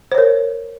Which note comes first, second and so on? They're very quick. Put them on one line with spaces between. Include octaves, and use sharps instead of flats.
C5 C#5 A#4